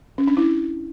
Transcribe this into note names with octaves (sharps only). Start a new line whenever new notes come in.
C#4
D4
E4